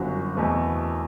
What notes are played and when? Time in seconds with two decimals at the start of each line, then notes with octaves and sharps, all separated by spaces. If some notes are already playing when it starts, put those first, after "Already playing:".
Already playing: G1 F#2 F#3 C4 F#4
0.35 E2 B2 A3 C4